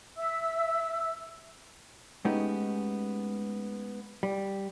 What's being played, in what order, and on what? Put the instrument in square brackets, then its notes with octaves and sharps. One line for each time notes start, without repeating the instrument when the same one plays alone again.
[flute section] E5 E6
[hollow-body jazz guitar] G#3 A3 B3 C#4 D#4 G4
G3